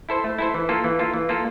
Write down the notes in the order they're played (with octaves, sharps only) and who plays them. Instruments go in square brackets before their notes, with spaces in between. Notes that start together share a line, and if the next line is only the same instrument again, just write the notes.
[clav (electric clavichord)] E4 A4 C5
A3
E4 A4 C5
E3
A#3 F4 A4
E3
A#3 F4 A4
E3
A#3 F4 A4